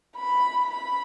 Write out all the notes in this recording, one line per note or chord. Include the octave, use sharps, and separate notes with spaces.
B5
B5